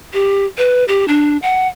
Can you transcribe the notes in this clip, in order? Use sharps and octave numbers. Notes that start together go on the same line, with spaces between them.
G4
B4
G4
D4
F#5